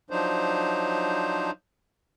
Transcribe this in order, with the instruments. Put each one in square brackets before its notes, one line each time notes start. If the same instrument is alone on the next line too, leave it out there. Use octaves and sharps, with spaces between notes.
[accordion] F3 F#3 D4 D#4 C5